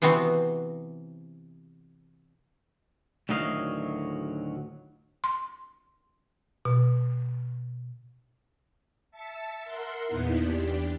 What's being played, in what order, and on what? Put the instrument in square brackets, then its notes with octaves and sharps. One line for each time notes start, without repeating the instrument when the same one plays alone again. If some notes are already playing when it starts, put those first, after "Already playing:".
[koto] C3 E3 B3 C4 F#4
[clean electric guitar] D2 A2 D#3 F#3 D#5 F5
[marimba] C6
B2
[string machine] E5 A5 C#7
A#4 E5 F#5 C6
E2 A#2 B3 D#4 E4
E2 D4 G4